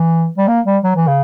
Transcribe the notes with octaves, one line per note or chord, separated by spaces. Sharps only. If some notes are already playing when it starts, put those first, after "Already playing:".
Already playing: E3
G3
A#3
G3
F#3
E3
C#3